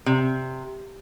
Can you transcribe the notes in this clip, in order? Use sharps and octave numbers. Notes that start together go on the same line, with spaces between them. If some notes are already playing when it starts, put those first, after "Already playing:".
C3